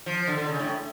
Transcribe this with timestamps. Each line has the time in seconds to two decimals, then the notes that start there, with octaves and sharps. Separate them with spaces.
0.06 F3
0.27 D3
0.38 D3
0.49 C#3
0.59 A2